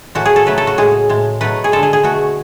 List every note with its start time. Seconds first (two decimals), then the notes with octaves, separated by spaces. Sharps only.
0.15 A2 E3 A3 F#4
0.25 G#4
0.36 A4
0.46 C#3 F#3 A3 B4
0.58 A4
0.67 F#4
0.78 A2 G#3 G#4
1.09 A2 G#3
1.41 B2 F#3 A3 B4
1.64 G#4
1.72 D3 G#3 A4
1.83 G#4
1.93 G#4
2.03 B2 A3 F#4